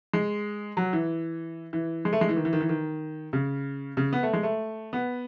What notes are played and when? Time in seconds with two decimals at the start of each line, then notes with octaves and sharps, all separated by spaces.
0.13 G#3
0.77 F#3
0.93 E3
1.73 E3
2.05 G#3
2.13 A3
2.21 G#3
2.29 E3
2.36 D#3
2.45 E3
2.53 D#3
2.61 E3
2.69 D#3
3.33 C#3
3.97 C#3
4.13 B3
4.23 A3
4.33 G#3
4.43 A3
4.93 B3